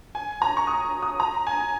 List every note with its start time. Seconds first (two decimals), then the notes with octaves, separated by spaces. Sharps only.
0.15 G#5
0.42 A#5
0.57 C#6
0.67 D#6
1.02 D#6
1.20 A#5
1.47 G#5